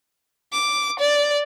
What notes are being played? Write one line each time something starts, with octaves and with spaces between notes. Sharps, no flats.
D6
D5